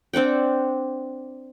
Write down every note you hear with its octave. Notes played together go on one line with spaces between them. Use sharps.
C4 D4 F#5 G5